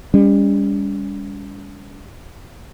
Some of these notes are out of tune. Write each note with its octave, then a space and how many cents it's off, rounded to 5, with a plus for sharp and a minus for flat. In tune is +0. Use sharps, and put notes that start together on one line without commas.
G3 +40 C#4 +40